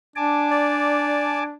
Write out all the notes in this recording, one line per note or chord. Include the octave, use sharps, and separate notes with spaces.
D4 G#5 A5 D6
D5